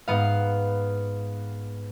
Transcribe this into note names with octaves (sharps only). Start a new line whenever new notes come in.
G#2 B3 F5